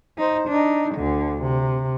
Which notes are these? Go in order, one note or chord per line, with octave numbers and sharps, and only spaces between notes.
D#4 C5
D4 D#4
D2 D3
C3